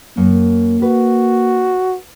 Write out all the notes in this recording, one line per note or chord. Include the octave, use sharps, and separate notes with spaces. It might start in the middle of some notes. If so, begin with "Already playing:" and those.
F#2 A#3
F#4 B4